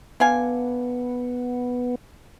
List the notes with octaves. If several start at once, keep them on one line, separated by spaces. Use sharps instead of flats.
D3 B3 F5 G#5